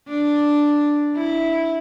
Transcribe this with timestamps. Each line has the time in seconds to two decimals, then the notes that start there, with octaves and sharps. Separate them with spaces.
0.09 D4
1.16 E4